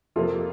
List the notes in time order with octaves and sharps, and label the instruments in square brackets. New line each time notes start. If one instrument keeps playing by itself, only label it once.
[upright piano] F2 C3 F3 A#3 F4 A4